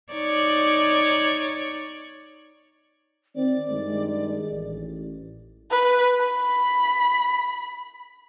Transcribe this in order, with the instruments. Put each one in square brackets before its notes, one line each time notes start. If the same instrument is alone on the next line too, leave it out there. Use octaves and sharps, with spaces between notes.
[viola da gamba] D#4 C#5 D5
[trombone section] D#3 C4 [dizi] D5
[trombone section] G2 D#3 G#3
A1
[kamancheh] B4
B5